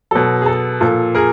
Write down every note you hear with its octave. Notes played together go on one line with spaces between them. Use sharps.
B2 F#3 A4
G#4
A4
A#2 F3 A4
G#4 A#4